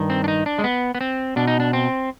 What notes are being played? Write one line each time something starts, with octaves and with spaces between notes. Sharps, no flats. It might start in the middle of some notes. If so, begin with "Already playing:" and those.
Already playing: G2 D#3
C4
D4
D#4
D4
G#3
B3
B3
C4
B2 D4
D#4
D4
C4